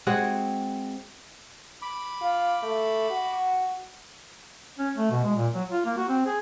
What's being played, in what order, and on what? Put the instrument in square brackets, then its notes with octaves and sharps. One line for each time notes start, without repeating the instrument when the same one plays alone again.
[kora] G#3 C4 F#4 G#4
[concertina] B5 D6
[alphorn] F4
A3
F#4
[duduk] C#4
A3
B2
G#3
A#2
F#3
F4
A#3
F#4
C4
G#4